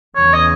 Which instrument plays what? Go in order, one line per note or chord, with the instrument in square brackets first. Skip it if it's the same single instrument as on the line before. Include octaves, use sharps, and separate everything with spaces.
[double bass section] E2 C#3 E3 [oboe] C#5
[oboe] D#5